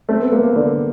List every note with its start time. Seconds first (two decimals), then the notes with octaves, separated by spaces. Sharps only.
0.08 A3 C4
0.20 B3
0.32 A3 A#3
0.43 A#3
0.56 D3